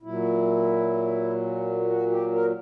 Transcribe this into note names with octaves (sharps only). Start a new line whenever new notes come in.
A#2 F#3 E4
F#4
G4
A#4